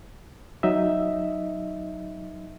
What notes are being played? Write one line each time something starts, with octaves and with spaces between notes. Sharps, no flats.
F#3 D#4 D#5 E5